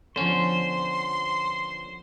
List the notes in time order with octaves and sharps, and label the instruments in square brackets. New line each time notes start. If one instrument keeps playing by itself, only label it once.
[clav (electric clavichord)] D3 C#4 [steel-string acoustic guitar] F3 B3 [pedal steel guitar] C5 [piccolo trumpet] C6